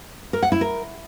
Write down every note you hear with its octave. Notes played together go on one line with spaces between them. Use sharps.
A#4
F#5
E4
A#4